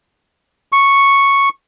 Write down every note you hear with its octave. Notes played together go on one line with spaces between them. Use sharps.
C#6